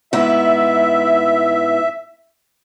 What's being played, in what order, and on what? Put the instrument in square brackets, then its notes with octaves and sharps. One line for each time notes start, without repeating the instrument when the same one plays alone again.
[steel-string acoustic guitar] G#2 B3 E4 [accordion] E5